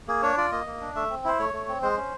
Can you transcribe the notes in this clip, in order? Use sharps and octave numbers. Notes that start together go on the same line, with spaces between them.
A#3 G#4
D4 C#5
F4 D5
A#3 D#5
A#3
D4
A3 E5
C4
E4 C5
A3 C#5
A3
C4
G#3 C5
C#4